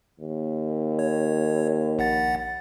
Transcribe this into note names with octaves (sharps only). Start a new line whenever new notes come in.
D#2
C#5
A#1 F#5 A6